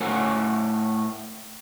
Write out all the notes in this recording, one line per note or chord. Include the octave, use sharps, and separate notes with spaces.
A2 A#4 C#5 F#5 G#5